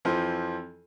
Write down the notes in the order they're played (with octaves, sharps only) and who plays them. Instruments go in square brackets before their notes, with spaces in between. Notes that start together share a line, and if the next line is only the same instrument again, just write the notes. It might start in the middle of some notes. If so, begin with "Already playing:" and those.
[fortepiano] F2 E3 F3